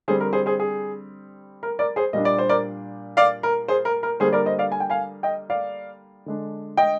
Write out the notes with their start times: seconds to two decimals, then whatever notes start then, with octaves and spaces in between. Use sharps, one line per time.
0.08 D3 G3 C4 G#4 C5
0.21 A#4
0.33 G#4 C5
0.46 G#4 C5
0.60 G#4
1.63 A#4
1.79 A#4 D5
1.96 G#4 C5
2.13 A#2 G3 A#3 D4 D#5
2.25 D5
2.38 C5
2.49 A#4 D5
3.17 D5 F5
3.43 A#4
3.68 G#4 C5
3.85 A#4
4.03 A#4
4.20 D3 G3 A#3 G#4 C5
4.33 A#4 D5
4.45 C5 D#5
4.59 D5 F5
4.72 G#5
4.80 G5
4.90 F5 G#5
5.23 D#5 G5
5.50 D5 F5
6.26 D3 G#3 D4
6.77 D#5 G5